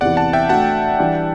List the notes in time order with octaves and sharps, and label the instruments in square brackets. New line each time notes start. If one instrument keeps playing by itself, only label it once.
[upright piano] E2 C3 E3 [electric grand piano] D5 F#5
[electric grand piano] F#5 A5
E5 G5
[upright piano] A3 D4 F#4 [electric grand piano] F#5 A5
[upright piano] E3 G3 D4 G4